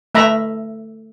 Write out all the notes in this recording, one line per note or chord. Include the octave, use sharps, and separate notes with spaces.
A3 E5 A#5 B5